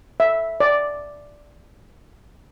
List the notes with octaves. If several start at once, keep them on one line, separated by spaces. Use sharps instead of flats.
E5
D5